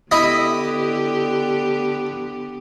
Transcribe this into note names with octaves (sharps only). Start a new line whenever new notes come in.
D3 B3 E4 G4 D#5